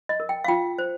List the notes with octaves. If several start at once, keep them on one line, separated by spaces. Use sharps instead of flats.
D#5
A#4
G5
F5
F4 G5
C5